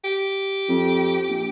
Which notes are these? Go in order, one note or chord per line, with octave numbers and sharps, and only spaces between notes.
G4
F2
A#1